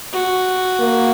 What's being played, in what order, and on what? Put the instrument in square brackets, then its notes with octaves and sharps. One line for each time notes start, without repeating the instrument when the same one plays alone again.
[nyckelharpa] F#4
[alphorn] A#3